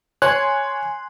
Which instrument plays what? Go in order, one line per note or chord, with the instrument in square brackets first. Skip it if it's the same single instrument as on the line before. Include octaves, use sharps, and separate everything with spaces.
[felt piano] C#5 [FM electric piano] G#5 C6 [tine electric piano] F#6